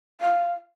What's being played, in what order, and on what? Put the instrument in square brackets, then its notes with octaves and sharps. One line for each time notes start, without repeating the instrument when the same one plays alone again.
[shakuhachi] F5